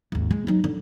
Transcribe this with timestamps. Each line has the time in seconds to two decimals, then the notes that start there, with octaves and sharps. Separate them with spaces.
0.12 G#1 D#2
0.31 G#3
0.47 F#3 D#4
0.64 D3